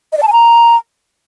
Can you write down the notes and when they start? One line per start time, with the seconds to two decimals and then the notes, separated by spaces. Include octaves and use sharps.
0.12 D#5
0.17 D5
0.22 A5
0.27 G#5
0.32 A#5